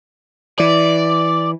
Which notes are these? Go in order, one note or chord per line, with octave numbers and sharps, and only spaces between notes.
E3 D5